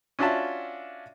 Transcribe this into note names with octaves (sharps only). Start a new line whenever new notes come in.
C#4 D4 F4 F#4 E5 A5